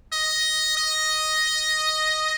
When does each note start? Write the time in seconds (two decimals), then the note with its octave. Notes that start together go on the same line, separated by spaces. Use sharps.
0.12 D#5
0.77 D#5